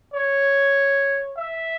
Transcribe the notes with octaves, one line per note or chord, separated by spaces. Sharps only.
C#5
E5